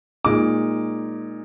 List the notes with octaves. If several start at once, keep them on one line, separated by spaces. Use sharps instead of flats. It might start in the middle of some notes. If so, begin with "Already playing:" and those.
A#2 G#3 D#4 D6